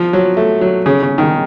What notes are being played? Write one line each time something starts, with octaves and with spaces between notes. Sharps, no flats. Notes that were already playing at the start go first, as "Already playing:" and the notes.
Already playing: F3
F#3
A3
F#3
C#3
C#3
D#3